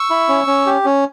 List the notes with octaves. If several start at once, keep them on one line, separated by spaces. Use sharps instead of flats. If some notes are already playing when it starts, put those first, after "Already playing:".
Already playing: C#6 E6
E4
C#4
C#4
G4
C#4